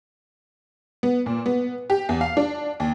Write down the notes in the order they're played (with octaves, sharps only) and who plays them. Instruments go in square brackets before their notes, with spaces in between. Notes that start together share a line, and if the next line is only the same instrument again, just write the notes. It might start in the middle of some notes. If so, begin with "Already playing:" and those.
[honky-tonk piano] B3
A#2
B3
G4
E2
F5
D4
D#2